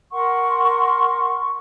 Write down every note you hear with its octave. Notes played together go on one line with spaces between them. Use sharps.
A#4 F#5 C6 C#6